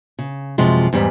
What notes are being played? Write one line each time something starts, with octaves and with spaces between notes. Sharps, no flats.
C#3
F#2 C3 F3 G#3
E2 G#2 G3